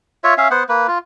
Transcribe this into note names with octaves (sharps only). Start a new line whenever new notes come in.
F4 C#5 E5
C#4 E5 F5
B3 C5 F#5
A#3 B4
F4